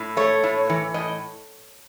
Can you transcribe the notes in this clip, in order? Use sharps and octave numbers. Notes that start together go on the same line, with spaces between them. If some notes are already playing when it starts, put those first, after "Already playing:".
Already playing: A2
A3 C#5
A2
E3
A2 D#5